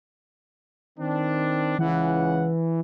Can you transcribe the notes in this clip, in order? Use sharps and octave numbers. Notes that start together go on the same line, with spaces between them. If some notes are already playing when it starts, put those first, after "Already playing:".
D#3 C4 D4
C#2 C#3 E3 F#5